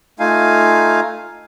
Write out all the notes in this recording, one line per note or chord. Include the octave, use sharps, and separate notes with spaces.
A3 D#4 F4 F5 G#5